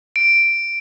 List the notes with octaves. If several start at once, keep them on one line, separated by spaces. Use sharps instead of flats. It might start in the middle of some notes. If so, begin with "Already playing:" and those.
D7